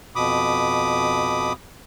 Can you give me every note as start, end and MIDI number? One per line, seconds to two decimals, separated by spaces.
0.16 1.53 41
0.16 1.53 47
0.16 1.53 83
0.16 1.53 86
0.16 1.53 87